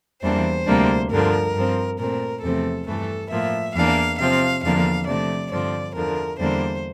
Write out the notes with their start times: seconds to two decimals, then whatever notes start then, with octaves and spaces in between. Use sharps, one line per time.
0.23 E2 E3 G3 A#3 D4 C5
0.68 D2 C3 G3 A#3 D4
1.11 G2 D3 F3 A#4
1.55 G2 F3 C4
1.99 A#2 A3 C4 A#4
2.43 E2 C3 F3 A3 C4 A4
2.87 G2 E3 A3 A4
3.31 A2 F3 A#3 E5
3.75 E2 E3 A#3 D4 F5
4.19 C3 F3 C4 F5
4.64 E2 D3 F3 A#3 D4 F5
5.07 C3 F3 A3 D4 D5
5.51 G2 D3 F3 C4 D5
5.95 E2 D3 F3 A#4
6.40 E2 D3 G3 A#3 D4 C5